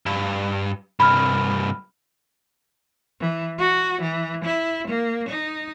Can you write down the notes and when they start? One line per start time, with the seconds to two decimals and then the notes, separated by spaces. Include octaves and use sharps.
0.06 G2
1.00 C2 G2 B5 F6
3.21 E3
3.59 F#4
4.01 E3
4.44 E4
4.88 A#3
5.29 D#4